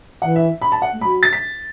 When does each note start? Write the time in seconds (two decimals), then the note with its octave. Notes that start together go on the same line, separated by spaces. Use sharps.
0.22 E3 F#5
0.36 E5
0.62 B5
0.72 A5
0.82 F#5
0.92 A3
1.01 F#3 B5
1.23 A6
1.33 B6